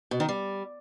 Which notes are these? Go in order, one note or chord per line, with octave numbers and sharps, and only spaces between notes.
B2
D#3
G3